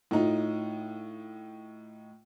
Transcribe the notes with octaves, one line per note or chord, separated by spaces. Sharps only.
A2 D#4 F4